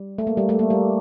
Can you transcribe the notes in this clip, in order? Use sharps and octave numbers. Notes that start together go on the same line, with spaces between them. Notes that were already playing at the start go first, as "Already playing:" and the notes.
Already playing: G3
A3
A#3
G3
A3
A#3
G3